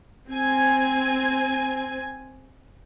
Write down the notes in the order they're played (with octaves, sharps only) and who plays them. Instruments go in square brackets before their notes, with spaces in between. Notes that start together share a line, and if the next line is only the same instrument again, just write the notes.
[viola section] C4 G#5